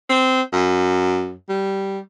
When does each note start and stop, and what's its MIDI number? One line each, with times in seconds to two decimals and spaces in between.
0.09 0.41 60
0.53 1.33 42
1.49 1.99 55